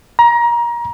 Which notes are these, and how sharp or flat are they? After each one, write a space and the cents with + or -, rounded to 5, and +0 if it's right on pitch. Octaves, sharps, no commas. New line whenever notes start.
A#5 +25